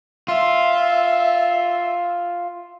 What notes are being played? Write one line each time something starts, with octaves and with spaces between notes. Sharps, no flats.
F4 E5